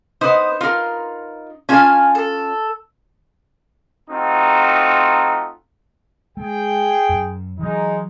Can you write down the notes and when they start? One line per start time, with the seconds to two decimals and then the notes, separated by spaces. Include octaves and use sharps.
0.21 B3 D#4 B4 C5 D#6
0.61 D#4 F4 A#4 C6
1.69 C#4 F4 F5 G#5 A5
2.15 A4
4.10 A3 C4 D#4 F4 F#4 A#5
6.37 G#3 G#4 G5
7.09 F#2
7.59 E3 F#3 G#3 D#4